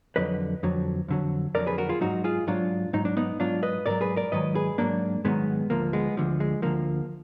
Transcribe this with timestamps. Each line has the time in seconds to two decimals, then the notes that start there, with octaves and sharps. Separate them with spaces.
0.16 F2 D3 F#3 B4 D#5
0.63 F2 D3 F#3
1.08 F2 D3 F#3
1.55 F2 D3 F#3 A#4 D5
1.66 G#4 B4
1.78 F#4 A#4
1.89 F4 G#4
2.01 G#2 F#3 D#4 F#4
2.24 F4 G#4
2.47 G#2 F#3 D4 F4
2.93 G#2 F#3 D#4
3.05 D4
3.17 B3 D#4
3.39 G#2 F#3 D4 F4
3.63 B4 D#5
3.86 G#2 D#3 F#3 A#4 D5
4.01 G#4 B4
4.16 A#4 D5
4.32 G#2 D#3 F#3 B4 D#5
4.55 G#4 B4
4.78 G#2 D#3 F#3 A#3 D4
5.25 G#2 D#3 F#3 G#3 B3
5.70 D2 D3 F3 A#3
5.93 G#3 B3
6.17 D2 D3 F3
6.40 G#3
6.62 D2 D3 F3 A#3